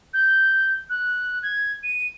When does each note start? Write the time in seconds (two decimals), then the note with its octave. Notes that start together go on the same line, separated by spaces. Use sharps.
0.13 G6
0.90 F#6
1.43 G#6
1.83 D#7